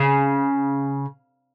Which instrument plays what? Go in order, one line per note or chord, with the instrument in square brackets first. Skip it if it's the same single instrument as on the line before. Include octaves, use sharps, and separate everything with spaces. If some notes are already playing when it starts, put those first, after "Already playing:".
Already playing: [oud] C#3